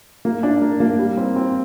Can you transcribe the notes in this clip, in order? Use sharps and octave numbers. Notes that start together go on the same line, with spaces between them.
A#3
D4
A#3
A#3
G3
C4
C4